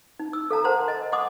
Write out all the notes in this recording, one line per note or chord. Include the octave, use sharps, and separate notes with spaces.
D#4
E6
A4 F5 A5 A#5
A#4 C5 F#5 A5 A#5 C6
D#5 G#5
F#5 G#5 C6 D6 D#6